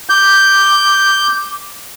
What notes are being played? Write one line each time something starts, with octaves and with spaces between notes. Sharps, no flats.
D6 G6